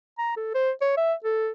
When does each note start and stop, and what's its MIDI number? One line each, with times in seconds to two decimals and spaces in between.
0.18 0.32 82
0.37 0.52 69
0.54 0.71 72
0.81 0.92 73
0.97 1.13 76
1.24 1.50 69